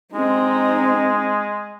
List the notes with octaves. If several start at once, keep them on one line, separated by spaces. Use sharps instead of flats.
G#3 C4 D#4